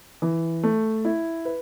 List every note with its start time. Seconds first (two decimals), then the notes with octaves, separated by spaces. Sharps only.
0.22 E3
0.63 A3
1.05 E4
1.45 B4